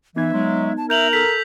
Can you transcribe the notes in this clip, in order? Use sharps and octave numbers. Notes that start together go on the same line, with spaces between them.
E3 B3 D#4 E5 G#6
F#3 G#3
A5
A#4 E5 G6 F7 F#7
A4 B6